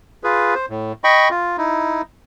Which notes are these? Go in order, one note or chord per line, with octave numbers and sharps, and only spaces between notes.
F4 G#4 B4
C5
A2
D#5 G5 B5 C#6
F4
D#4 E4